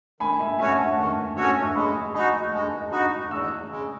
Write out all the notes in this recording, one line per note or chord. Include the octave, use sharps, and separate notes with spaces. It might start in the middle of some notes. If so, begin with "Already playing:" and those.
D#3 G#5 B5
E5 G#5
A3 C#4 F#4 C#5 E5 G#5
F#5 A5
D#3 A5 C#6
A3 C#4 F#4 C#5 E6
C#6 E6
G#3 B5 D#6
D#4 F#4 G#5 B5
G#3 A5 C#6
D#4 F#4 B5 D#6
E2 C#6 E6
C#3 G#3